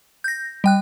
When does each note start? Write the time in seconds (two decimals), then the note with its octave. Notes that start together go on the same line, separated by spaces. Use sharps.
0.24 G6 A#6
0.64 G3 G5 F#6